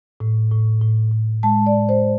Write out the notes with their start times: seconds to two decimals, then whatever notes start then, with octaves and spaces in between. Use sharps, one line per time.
0.20 A2
0.51 A2
0.81 A2
1.12 A2
1.43 G#3 A5
1.66 D5
1.73 A2
1.89 C5